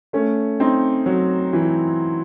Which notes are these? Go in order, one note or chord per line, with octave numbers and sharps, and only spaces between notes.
A3 C#4
C4 D#4
F#3
E3